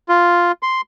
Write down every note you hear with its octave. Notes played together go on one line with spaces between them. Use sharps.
F4
C6